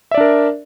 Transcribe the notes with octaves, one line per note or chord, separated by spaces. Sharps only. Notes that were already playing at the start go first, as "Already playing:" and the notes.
D4 A#4 D5 E5